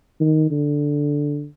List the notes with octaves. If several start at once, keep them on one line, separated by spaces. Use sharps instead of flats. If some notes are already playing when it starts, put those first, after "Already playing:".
D#3
D3